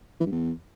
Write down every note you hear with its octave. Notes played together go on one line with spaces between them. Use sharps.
E3
G2
E2